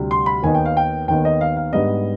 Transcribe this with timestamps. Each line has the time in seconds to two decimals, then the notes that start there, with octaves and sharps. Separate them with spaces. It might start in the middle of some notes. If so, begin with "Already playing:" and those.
Already playing: D2 C3 G3
0.11 C6
0.26 B5
0.43 D#2 D#3 B3 D#4 G#5
0.55 G5
0.65 F5
0.77 G5
1.08 D#2 D#3 B3 D#4 G5
1.25 D#5
1.41 F5
1.57 F5
1.73 G#2 G3 B3 D4 D#5